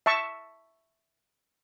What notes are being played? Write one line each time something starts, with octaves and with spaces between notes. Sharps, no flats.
E5 A5 C#6